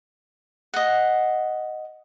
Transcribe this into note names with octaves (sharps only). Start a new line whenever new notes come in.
D#5 F#5